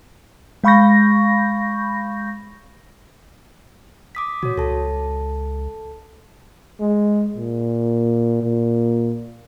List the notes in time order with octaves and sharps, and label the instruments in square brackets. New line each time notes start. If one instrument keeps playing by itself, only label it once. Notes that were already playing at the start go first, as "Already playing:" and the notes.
[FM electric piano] G#3 F5 B5 C#6 G6 A#6
[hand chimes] D6 D#6 B6
[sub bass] A#2 [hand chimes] F#4 C#5
[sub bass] C#2 [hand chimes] A4 A5
[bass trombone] G#3
A#2
A#2